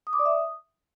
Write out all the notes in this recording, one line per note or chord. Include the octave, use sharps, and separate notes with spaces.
D#6
D6
D5
E5
D#6